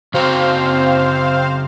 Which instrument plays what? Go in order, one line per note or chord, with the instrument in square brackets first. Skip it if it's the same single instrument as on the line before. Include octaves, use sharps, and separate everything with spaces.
[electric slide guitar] C#3 F#4 A#5 [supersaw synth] C4 C5 F5